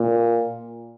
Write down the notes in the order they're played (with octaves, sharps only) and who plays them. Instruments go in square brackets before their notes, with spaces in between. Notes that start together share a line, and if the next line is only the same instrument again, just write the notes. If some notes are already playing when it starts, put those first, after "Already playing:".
Already playing: [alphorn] A#2